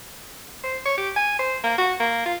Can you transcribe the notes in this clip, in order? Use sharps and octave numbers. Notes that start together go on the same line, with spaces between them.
C5
C#5
G4
G#5
C5
A#3
F#4
A#3
F4